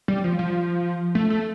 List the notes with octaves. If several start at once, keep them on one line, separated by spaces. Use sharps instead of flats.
G3
F3
F3
A3
A3